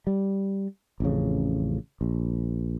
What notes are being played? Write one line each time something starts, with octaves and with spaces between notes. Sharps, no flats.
G3
A1 F2 C#3
A#1